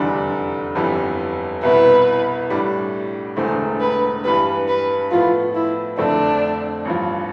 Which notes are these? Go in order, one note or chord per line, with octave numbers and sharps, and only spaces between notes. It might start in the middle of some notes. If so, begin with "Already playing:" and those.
Already playing: F1 E2 D3 G3 D4
G1 F2 E3 G3 B3
C2 B2 B3 E4 B4
A1 A2 G3 D4
E1 E2 D3 A3 C5
B4
G2 E3 G3 B4
B4
A2 F3 B3 F4
E4
F2 D3 A3 C4 D4
A1 G2 F3